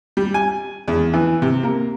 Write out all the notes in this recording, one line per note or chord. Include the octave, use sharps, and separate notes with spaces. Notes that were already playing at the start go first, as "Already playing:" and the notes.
G3
G#5
E2
E3
C3
A#3